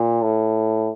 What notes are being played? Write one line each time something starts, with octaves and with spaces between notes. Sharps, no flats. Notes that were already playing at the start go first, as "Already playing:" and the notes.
Already playing: A#2
A2